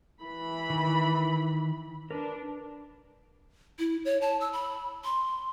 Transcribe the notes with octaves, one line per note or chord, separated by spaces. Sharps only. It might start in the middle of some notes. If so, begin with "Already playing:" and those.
E3 B5
D#3
D4 A#4 B4
E4
C#5
A5
E6
B5
C6